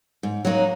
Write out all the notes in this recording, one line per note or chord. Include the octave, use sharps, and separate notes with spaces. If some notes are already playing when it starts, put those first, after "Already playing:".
G#2
F#3 A#3 D#4 F#4